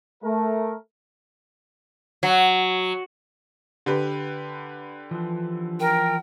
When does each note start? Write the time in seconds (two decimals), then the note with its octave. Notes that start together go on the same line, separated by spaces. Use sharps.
0.24 A3 A#4
2.23 F#3
3.86 D3 G4 B4
5.11 E3 F3
5.80 A#4 G5